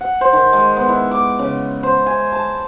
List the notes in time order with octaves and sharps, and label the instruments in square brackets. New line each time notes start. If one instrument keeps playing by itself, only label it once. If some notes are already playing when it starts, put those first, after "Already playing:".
[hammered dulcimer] F#5
C5
D#3
G#3
B3
E4
D6
C#3
C5
G#5
A5